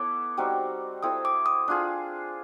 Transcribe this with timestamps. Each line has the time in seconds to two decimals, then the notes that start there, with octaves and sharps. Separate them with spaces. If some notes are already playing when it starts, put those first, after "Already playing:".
Already playing: B3 E4 A4 C#5 D6
0.37 G3 C4 D#4 F#4
1.03 C4 E4 A4 D#6
1.25 D6
1.46 D#6
1.68 D4 F4 G#4